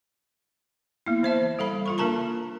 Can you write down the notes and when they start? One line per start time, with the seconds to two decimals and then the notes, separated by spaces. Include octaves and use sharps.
1.06 A#3 B3 E4
1.23 E3 C5 E5 A5
1.59 G3 A4 F5 B5
1.86 F4 A4 C#6
1.98 A#3 D4 A#4 A5 A#5 C#6